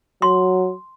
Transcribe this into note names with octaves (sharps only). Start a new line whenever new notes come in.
F#3 C6